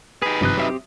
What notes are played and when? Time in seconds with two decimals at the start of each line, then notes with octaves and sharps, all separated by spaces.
0.22 D#4 G4 G#4 B4
0.41 G#1 G2 C3 F3 D#5 F#6
0.57 F#3 C4 G4 E5 D#6